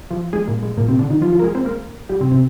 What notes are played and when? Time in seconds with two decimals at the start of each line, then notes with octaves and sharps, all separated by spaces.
0.11 F3 F4
0.33 G#3 G#4
0.48 A#2 A#3
0.63 G#3
0.77 A#2 A#3
0.88 C3 C4
0.99 D3 D4
1.10 D#3 D#4
1.21 F3 F4
1.32 F3 F4
1.39 A#4
1.43 G#3 G#4
1.55 C4 C5
1.65 A#3 A#4
2.09 G3 G4
2.21 C3 C4
2.32 C3 C4